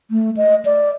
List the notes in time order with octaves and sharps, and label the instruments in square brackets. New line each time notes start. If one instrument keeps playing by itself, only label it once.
[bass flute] A3
D#5
D5